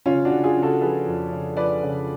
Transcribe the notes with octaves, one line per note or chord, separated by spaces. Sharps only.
C#3 C#4 F4
D4 F#4
C#3
F4 G#4
C#3
F#4 A4
F3 G#4 B4
F2
C#3
F3 B4 D5
C#3